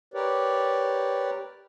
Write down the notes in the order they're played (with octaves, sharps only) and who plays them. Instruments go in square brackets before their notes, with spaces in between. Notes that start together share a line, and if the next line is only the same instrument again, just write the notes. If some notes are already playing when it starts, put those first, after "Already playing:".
[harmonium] G4 A#4 B4 C#5 D5